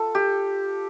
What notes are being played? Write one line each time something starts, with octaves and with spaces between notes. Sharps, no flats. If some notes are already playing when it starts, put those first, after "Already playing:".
Already playing: F4 A4
G4